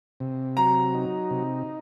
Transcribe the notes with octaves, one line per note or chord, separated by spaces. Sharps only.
C3
F#3 A#5
D#4
C3